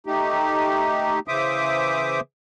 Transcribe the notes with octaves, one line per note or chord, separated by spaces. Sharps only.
A3 D#4 G4
C#3 E3 C5 E5 D6 D#6